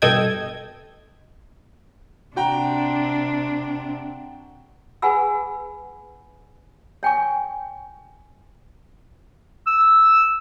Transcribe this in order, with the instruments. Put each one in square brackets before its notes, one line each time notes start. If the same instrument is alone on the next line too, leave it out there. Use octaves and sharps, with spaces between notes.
[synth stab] G2 B2 A4 D#5 G5 G#6
[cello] C3 D4 [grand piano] F#4 G5 A#5
[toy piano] G#4 B4 F#5 G#5 B5 E6
C#5 G5 G#5 C#6
[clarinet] E6